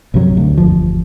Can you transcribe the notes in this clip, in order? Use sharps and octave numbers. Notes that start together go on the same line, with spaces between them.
A#1 F#2 C3 F#3
D2
G1 E2 F3